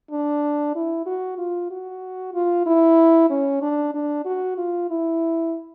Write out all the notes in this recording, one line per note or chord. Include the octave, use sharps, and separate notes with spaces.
D4
E4
F#4
F4
F#4
F4
E4
C#4
D4
D4
F#4
F4
E4